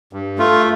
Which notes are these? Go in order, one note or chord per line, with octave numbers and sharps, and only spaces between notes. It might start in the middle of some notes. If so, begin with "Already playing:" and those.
G2
A3 F4